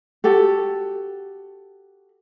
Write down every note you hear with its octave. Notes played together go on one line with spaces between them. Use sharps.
F#4 G4 A4